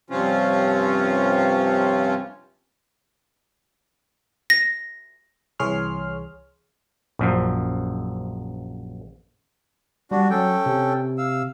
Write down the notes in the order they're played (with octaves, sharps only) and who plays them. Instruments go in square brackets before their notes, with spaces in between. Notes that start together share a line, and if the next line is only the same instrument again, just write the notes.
[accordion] G2 C3 F3 C4 C#4 F4
[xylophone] A#6
[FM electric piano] C2 E3 G#4 C#5 C6 F6
[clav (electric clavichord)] A#1 F#2 F3
[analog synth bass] G3 [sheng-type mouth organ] D4 F#4
[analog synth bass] F#3 [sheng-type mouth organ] C#4 A4 G5
[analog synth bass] C3
[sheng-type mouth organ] F5 E6